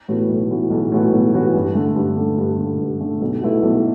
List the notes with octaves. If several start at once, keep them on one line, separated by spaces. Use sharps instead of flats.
A2 E3 B3 F#4
B1
A2 E3 B3 F#4
B1
A2 E3 B3 F#4
B1
A2 E3 B3 F#4
G2
D3 A3
G2
D3 A3
G2
D3 A3
G2
D3 A3
B1
B2 A3 E4 A4
B1